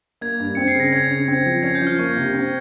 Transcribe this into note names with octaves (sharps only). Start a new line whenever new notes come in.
A#3 G#6
G2
C4 C#7
C7
C#3
A#6
C#4 G#6
C#3
C4
F3
C#4 G#6
G6
F3
F6
A#3 C#6
C3
C4